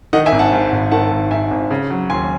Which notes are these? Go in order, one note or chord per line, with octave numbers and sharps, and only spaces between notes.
D#3 D#5 F#5
E5 G#5
G#1
F#5 A5
G#2
G#1
D#3 F#5 A5
G#1
G#2 E5 G#5
G#1
C#3
F#3
D#2 G#5 C6